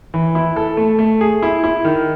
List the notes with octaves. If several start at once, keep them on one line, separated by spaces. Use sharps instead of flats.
E3
E4
A4
A3
A3
G#4
E4
E4
D#3